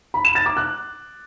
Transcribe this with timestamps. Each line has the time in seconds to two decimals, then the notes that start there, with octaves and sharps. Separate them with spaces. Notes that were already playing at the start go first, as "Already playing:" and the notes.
0.14 B5
0.25 E7
0.35 A6
0.46 D6
0.57 F#6